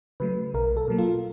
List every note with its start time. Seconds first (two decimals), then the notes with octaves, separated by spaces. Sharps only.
0.20 C#3 F#3 A3 B4
0.54 B1 A#4
0.77 A4
0.88 B2 F#3 A#3
0.99 F4